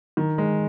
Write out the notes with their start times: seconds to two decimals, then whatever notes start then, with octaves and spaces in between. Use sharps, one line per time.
0.17 D#3
0.38 G#3